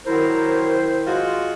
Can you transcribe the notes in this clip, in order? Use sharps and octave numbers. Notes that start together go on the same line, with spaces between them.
D#3 F#3 E4 A#4 C5
G#3 F4 F#4